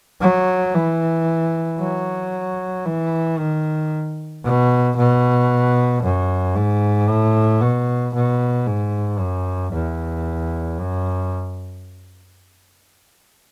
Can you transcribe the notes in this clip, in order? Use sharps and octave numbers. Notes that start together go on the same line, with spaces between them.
F#3
E3
F#3
E3
D#3
B2
B2
F#2
G#2
A2
B2
B2
G#2
F#2
E2
F#2